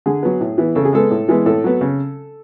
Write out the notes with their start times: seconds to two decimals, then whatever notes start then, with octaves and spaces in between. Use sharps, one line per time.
0.06 D3 G#4
0.23 F#3 B3
0.41 A2
0.58 E3 B3
0.75 C#3 A4
0.85 G#4
0.93 G#3 B3 A4
1.11 A2
1.28 E3 G#3 B3
1.46 A2 A4
1.64 F#3 B3
1.81 C#3